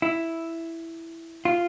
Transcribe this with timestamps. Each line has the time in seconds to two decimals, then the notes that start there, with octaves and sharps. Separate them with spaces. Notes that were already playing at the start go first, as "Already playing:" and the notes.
0.02 E4
1.45 F4